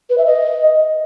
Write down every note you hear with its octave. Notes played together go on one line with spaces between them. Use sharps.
B4
E5
D#5